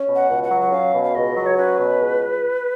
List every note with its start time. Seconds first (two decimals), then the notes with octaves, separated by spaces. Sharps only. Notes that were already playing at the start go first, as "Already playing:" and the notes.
Already playing: C#4
0.08 B2
0.15 F#5
0.29 C#2
0.43 F#5
0.51 F#3
0.61 F#5
0.72 C#4 F5
0.93 B2
1.04 F5
1.14 C#2 D#5
1.36 F#3
1.46 C#5
1.57 C#4 B4
1.79 B2
2.00 C#2